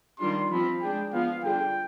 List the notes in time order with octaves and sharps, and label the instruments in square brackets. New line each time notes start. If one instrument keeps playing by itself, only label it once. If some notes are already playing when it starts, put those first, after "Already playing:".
[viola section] D#3 G3 D4 F4 [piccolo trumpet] C6
[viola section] F3 C4 F4 [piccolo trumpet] B5
[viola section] G#3 D4 G#4 [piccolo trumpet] G5
[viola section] F3 B3 F4 [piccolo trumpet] F5
[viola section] D3 G3 D4 F4 G#4 [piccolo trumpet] G5